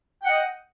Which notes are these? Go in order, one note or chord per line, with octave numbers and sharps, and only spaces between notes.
D#5 F#5 G5